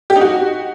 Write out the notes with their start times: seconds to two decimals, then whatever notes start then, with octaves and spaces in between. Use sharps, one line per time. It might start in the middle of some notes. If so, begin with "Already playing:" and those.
0.10 G4
0.16 D#4
0.21 F#4